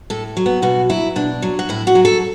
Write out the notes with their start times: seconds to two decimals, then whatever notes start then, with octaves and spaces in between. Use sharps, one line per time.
0.10 A2 A4
0.37 F#3
0.46 B3
0.62 B2 F#4
0.89 F#3 E4
1.16 B2 D4
1.42 F#3
1.59 F#4
1.69 A2 E4
1.87 F#4
1.95 F#3
2.05 A4